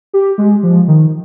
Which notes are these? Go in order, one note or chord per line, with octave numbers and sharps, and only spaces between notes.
G4
G#3
F3
D#3